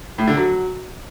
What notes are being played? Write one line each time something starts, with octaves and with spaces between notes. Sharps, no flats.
A2
D3
F#3